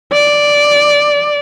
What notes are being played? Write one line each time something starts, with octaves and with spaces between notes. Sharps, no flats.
D5